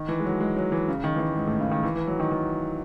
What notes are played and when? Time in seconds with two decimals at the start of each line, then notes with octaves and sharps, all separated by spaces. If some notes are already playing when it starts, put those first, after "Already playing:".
Already playing: D#3
0.08 E3
0.20 G#3
0.25 F#3
0.40 G#3
0.56 F#3
0.72 E3
0.88 C#3
1.04 D#3
1.16 E3
1.19 D#3
1.36 G#2
1.47 A2
1.60 C#3
1.71 D#3
1.83 E3
1.96 E3
2.07 F#3
2.20 D#3
2.31 D#3